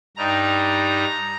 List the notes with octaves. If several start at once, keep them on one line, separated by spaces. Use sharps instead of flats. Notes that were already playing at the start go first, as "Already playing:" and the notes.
G2 G3 D#4 A#5